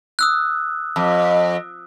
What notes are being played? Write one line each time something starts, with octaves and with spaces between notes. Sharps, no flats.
D#6 E6 F#6
F2